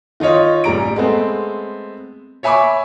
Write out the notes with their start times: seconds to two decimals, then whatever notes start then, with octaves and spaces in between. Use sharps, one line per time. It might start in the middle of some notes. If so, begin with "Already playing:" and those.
0.20 D#3 D#4 F4 C#5 D#5
0.64 A1 G3 A#5 D7
0.96 G#3 A3 B3 C4
2.43 C#5 E5 G#5 B5 C#6 D6